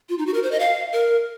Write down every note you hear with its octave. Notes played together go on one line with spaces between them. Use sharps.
F4
D#4
F#4
A#4
C5
D#5
F5
A#4